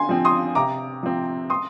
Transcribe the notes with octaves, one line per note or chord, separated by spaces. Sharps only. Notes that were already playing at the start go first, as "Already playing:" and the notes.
Already playing: D3 G#5 C6
F3 C4
C6 D#6
C3 A#5 D6
F3 C4
C6 D#6